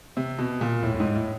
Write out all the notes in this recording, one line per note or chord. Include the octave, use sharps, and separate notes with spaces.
C3
B2
A#2
A2
A2
G#2
A2